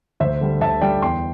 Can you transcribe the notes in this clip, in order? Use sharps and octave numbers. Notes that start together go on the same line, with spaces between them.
D2 C5 E5
D3 G3
D2 E5 A5
D3 G3 D5 G5
E2 G5 C6